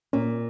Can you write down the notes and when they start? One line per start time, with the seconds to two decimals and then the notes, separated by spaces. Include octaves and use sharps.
0.13 A#2 C#4